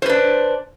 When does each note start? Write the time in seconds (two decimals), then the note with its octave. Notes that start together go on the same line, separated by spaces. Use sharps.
0.02 C5
0.06 B4
0.09 D4